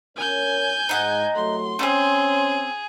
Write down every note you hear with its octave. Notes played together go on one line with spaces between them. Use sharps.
C#4 A#4 C#5 G#5 G6
G#2 D#4 F#5
C2 F#3 A3 C6
A3 C4 C#4 G#4